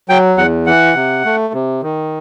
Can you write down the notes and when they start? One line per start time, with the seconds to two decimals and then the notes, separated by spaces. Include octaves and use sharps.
0.09 F#3 G5
0.37 E2 F#5
0.66 E3 F#5
0.95 C3
1.25 A3
1.54 C3
1.82 D#3